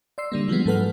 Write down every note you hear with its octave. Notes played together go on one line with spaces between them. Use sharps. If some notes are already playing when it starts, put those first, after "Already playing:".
D5 C6 E6 C7
D3 G3 A#3
E3 F3 G3 G#3 B3
G#2 F#3 A4 B4 F#5 F6